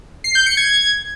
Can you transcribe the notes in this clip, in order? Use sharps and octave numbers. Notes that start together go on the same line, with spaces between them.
C7
G6
C#7
G#6